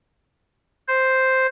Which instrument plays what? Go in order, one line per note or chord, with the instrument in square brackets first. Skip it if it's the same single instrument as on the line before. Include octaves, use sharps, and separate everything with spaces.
[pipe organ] C5